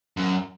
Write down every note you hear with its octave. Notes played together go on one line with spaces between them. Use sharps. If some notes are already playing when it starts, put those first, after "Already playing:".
F#2